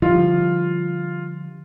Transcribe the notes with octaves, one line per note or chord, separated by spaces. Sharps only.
D3 F3 G3 F4